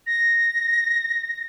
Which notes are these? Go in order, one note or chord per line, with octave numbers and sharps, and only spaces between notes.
A#6